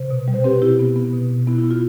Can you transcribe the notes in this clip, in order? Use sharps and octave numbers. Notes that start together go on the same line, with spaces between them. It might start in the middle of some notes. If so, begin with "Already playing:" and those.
Already playing: C3 C5
B2
G3
C5
C4 G4 B4
B2 E4 G4
B3
B3
B2
B2
B3 E4
E4
B3
F4